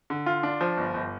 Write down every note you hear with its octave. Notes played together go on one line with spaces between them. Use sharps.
D3
F4
D4
F3
G1
G1